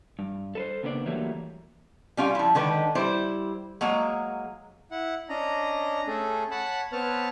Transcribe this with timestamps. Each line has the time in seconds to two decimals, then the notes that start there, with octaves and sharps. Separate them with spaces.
0.19 G2
0.55 A4 B4 C5
0.83 C#3 A#3 B3 D4 D5
1.06 E3 F#3 G3 A3 A#3
2.17 G3 C#4 F4 F5
2.35 F3 E4
2.55 D3 D#3 G#3 B4
2.95 G3 E4 C5
3.81 F#3 G#3 A#3
4.91 E4 F#5
5.29 C#4 D4 D#5 A#5
6.07 A3 C#4 G#4 A4
6.51 C#5 F#5 A5 B5
6.92 B3 C4 B4 C#5 A5 F6